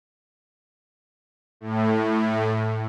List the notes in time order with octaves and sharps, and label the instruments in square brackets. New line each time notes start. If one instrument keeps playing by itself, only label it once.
[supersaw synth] A2